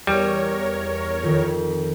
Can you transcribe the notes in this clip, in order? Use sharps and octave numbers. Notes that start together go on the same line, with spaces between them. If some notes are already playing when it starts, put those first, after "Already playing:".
E2 G3 A#4 C#5
F2 D#3